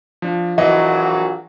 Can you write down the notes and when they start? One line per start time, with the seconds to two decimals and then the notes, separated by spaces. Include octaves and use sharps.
0.22 F3 D4
0.58 A#1 A#2 E3 F#3 D#5